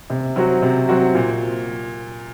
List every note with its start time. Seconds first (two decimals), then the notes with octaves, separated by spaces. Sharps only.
0.10 C3
0.36 F#3 C4 F#4
0.62 C3
0.89 F#3 C4 F#4
1.15 A#2